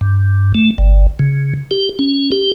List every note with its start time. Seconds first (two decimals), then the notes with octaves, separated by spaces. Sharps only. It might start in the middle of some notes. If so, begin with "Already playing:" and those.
0.01 G2
0.55 A3
0.78 G1
1.19 C#3
1.71 G4
1.99 C#4
2.32 G4